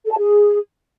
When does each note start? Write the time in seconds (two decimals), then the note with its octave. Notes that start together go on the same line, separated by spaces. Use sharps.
0.05 A4
0.12 A5
0.18 G#4